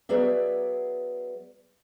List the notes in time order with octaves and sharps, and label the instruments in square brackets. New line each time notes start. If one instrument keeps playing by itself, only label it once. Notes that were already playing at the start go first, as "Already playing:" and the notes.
[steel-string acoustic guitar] F#3 B3 G#4 D5 E5